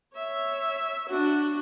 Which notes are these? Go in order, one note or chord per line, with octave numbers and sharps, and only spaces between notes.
C#5 E5
D4 F#4